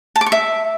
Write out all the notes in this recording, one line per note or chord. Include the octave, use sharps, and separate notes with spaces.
A5
D6
C#6
E5